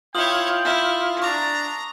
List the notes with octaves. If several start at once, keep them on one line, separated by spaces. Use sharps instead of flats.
E4 F4 C#5 G5 D#6 F#7 G7
E4
D4 A#5 C#6 D6